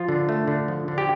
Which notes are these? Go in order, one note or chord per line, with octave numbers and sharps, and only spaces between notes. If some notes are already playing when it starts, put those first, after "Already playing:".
Already playing: F3 F4
D3
A3
D3
F3
D3
G4